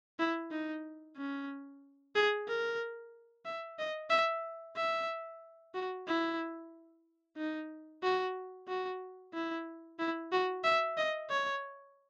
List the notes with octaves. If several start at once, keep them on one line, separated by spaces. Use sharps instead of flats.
E4
D#4
C#4
G#4
A#4
E5
D#5
E5
E5
F#4
E4
D#4
F#4
F#4
E4
E4
F#4
E5
D#5
C#5